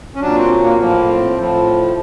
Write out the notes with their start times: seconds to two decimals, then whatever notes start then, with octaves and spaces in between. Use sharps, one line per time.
0.15 C#4
0.21 A#2 F#3 D4
0.36 C4
0.64 A#3
0.79 A2 F3 A#3
1.08 C4
1.36 A2 F3